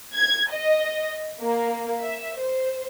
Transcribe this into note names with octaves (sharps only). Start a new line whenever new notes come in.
G#6
D#5
A#3
E5
C5